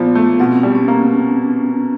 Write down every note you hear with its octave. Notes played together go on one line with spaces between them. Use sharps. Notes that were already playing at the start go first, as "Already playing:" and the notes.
Already playing: A#2 F3 B3
A3
B2 C4
G3
C#4
A#3